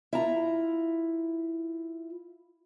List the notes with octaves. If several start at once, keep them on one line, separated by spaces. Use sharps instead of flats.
E4 F4 A#5